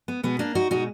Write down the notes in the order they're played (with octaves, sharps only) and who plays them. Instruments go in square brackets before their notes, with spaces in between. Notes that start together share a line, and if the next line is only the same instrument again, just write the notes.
[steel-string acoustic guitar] B3
B2 G#3 B3
A#3 D4
D#4 F#4
B2 G#3 D#4 F#4